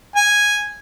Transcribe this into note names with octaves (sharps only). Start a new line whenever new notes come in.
G#5